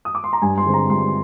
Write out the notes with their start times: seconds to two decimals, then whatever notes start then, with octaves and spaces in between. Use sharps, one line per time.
0.05 D#6
0.15 D6
0.24 C6
0.33 A#5
0.42 G2 G#5
0.58 C6
0.66 D3 G#3 C4
0.74 A#5
0.90 G2 C6